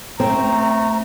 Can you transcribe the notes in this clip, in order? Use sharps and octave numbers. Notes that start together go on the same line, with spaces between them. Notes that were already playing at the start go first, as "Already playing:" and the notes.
A3 C4 A#5